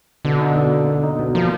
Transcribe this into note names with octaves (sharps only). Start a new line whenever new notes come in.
B2 D3
D#4
B2
A#3
B2
D#4
B2
F3 A#3